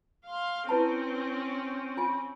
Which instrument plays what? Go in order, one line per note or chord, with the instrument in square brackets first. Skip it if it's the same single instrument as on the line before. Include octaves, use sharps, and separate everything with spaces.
[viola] F5 C6
[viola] C4 C#4 [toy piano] E4 B4 A5
[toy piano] F4 G#5